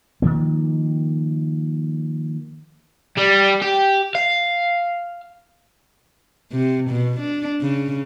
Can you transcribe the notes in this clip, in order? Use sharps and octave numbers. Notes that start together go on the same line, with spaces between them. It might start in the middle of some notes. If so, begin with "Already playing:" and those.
D#3 F3 A#3
G3
G4
F5
C3
B2
D4
C#3